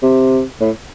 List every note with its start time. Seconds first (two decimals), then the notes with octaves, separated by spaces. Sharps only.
0.02 C3
0.60 A2